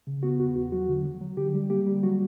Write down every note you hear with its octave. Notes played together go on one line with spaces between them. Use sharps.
C#3
B3 F#4
E2 F#4
E2 F#4
F#3 F#4
D3
F#3
F#3
D3 G4
G3
A#3 G4
G3
F#3 F#4